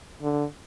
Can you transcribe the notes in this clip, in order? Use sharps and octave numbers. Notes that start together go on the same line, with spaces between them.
D3